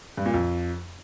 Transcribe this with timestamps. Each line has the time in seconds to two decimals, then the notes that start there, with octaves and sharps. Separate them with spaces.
0.18 G2
0.26 A#2
0.34 F2